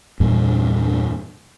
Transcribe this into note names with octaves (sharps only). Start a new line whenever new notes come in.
E2 G2 A#2